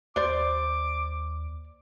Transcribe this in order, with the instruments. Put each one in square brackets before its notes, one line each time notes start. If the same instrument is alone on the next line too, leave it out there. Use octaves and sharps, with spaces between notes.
[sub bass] D#2 [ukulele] C5 D5 [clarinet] D6